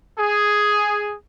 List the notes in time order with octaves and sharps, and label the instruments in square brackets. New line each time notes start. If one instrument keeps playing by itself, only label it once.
[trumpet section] G#4